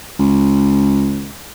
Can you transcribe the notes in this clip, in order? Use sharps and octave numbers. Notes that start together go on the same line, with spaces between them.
C#2